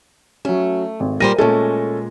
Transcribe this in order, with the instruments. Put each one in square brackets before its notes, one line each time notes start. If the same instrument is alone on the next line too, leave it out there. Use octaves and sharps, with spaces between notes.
[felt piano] F#3 C#4 [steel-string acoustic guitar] A3
[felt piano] G#1
[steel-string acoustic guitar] A#2 G3 C5 [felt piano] A#4 A#6 D#7
[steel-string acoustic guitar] A#2 G#3 [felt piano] A3 C#4 A4